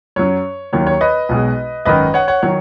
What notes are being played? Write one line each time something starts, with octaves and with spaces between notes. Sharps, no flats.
F#2 F#3 C#5
D#2 D#3 F#3 C#5
C#5
B4 D#5
B1 B2 G#3
G#1 F#2 D#3 B4 D#5
C#5 F#5
C#5 F#5
D#3 F#3 C#5